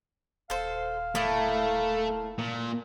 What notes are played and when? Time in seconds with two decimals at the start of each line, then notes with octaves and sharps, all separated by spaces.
0.50 D#1 A4 C5 F5
1.15 A2 A3 A#3
2.38 A#2